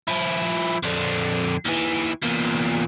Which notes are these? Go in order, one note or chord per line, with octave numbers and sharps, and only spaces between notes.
F3 E4
F2 D3
D#2 E3
E2 A#2